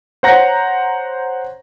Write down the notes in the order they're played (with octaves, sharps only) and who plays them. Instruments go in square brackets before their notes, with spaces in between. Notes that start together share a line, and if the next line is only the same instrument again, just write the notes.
[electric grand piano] C5 C#5 F#5 A#5 A#6